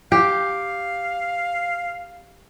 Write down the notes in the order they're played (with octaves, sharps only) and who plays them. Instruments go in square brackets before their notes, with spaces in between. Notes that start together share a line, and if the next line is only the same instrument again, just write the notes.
[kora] G4 [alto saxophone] F5